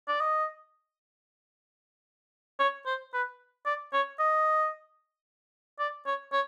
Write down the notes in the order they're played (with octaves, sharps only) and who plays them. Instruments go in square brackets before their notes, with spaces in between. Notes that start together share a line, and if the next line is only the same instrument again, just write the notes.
[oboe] D5
D#5
C#5
C5
B4
D5
C#5
D#5
D5
C#5
C#5